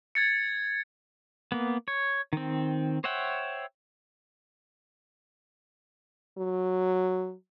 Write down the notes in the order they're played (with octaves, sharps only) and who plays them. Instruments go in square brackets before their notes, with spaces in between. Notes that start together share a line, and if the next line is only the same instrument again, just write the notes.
[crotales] G#6 A6 C#7
[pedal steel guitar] A#3 B3
C#5
D#3 C4
C5 C#5 E5 F#5 G5
[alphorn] F#3